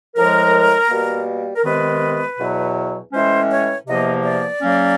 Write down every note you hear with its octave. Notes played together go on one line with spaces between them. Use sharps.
A2 F3 G#3 A#4
B2 G3 A#3
A#4
C3 D#3 G#3 B3 B4
E2 B2 F#3
A2 E3 G#3 C#4 C5
C#5
E2 C3 F3 A#3 D#5
D5
C#3 F#3 A#3 C#4